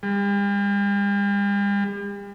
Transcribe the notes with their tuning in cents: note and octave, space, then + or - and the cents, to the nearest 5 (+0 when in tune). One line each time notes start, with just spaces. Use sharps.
G3 +45